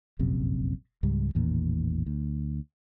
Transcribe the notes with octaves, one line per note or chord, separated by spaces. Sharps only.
F1 A#1 F#2 C3
C#2 G#2 G3
A1 E2 A#2 D#3
D2